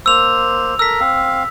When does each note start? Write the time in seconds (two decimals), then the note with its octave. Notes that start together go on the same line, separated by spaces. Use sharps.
0.06 A#3 C5 E6 F7
0.79 A4 A#4 A#5 E6 B6
1.00 C4 F5